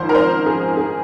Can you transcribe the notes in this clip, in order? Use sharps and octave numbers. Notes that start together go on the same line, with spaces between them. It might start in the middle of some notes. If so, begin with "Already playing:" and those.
Already playing: G#1 G#2 F3 C5
A#4
C5
G#4
G#4